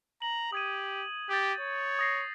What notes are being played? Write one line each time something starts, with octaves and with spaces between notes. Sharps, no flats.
A#5 F#7
G4 D#6 G#6 D#7
G4 G6 A6
C#5
D#6 A#6 C7